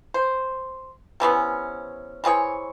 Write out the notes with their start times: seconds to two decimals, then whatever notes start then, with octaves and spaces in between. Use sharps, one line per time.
0.14 C5
1.20 C3 E3 B3 C#4
2.24 E3 C4 G#4 C#5